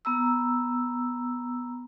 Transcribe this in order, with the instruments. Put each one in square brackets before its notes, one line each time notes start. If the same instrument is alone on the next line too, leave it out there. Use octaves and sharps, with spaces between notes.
[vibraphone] B3 A#5 E6